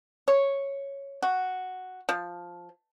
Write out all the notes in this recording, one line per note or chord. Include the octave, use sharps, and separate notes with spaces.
C#5
F#4
F3